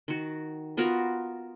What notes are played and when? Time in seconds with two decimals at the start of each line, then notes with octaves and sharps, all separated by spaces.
0.08 D#3 F#4
0.77 B3 F4 F#4 A#4